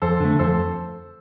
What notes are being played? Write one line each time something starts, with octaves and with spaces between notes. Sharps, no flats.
F2 A4 C5
D3 A3
F2 A4 C5